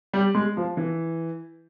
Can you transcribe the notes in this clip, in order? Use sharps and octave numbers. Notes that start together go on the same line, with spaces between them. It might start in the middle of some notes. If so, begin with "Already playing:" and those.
G3
G#3
F3
E3